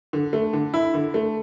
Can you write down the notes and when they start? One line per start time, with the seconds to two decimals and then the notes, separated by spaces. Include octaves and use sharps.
0.13 D3
0.33 A3
0.53 D3
0.74 E4
0.94 D3
1.14 A3